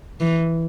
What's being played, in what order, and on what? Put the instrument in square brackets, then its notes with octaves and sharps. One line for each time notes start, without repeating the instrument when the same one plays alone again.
[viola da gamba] E3